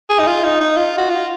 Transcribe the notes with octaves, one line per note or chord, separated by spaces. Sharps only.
G#4
D#4
F4
D#4
D#4
F4
F#4
F4